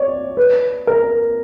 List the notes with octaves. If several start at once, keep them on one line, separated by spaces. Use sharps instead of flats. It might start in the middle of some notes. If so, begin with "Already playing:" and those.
Already playing: C#5 D5
B4
A#4